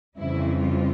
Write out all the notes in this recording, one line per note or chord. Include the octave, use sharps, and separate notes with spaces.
F2 C#3 E3 G3 C4 E4
F4